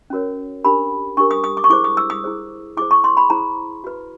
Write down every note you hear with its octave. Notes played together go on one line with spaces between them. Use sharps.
C#4 F#4 A#4 C#5
D4 G4 A#4 B5
D4 G4 A#4 C#6
D#6
D#6
D6
C#6
E4 G#4 C5 D6
D#6
E6
D#6
E4 G#4 C5
E4 G#4 C5 D6
C#6
C6
B5
E4 G#4 C5 A#5
F#4 B4